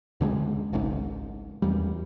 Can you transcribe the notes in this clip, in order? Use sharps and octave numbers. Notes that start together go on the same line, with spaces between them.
D2 D3 E3 G#3
G#1 C#2 G#2
E2 G3